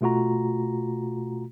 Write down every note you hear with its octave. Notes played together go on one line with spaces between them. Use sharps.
B2 A3 F4 F#4 A#5